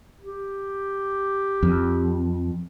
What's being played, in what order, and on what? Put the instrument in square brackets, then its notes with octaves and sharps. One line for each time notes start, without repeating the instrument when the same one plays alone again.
[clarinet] G4
[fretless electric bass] F2